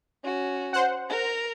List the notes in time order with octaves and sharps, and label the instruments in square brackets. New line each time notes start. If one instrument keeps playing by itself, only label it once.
[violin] C#4 F#4
[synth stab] C5 F#5
[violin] A#4 A#5